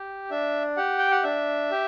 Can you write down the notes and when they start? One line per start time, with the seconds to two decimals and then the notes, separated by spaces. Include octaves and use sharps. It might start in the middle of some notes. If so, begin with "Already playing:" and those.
Already playing: G4
0.30 D4 E5
0.77 G4 F#5
0.98 G5
1.11 F#5
1.23 D4 E5
1.71 G4